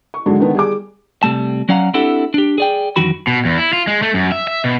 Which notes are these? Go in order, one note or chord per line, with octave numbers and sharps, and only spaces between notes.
C#6
G#2 D3 F#3 G#3
D3 D#3 B3
G3 G#4 D6
C3 G3 A3 A5
F#3 C#4 D5 F5 F#5 A#5
C4 D4 E4 G4 A4 F#5
D4 G4
G#4 D5 G5
F#2 D#3 E3 F#4 B5
B2
E2
E4
F4
G#3
A3
F#2
E5
E5
B2